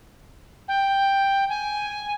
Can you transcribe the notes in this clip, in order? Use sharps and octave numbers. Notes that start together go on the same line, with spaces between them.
G5
G#5